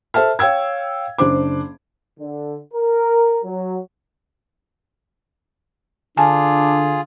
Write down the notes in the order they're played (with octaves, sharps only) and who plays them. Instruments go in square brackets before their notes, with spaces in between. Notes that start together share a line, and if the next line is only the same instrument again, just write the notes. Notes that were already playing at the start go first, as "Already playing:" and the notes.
[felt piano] A4 C5 E5 A5 F6
C#5 F5 G5 E6 G#6
F#1 D4 C5 D6
[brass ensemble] D3
A#4
F#3
[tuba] D3 [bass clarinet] D4 [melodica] F4 G#4 [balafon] G#5 A5